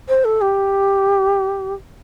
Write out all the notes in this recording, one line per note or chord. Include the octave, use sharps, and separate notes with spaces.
C5
A4
G4